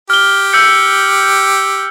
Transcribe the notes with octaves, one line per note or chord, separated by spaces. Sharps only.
G4 F6 G7
E6 G6 C#7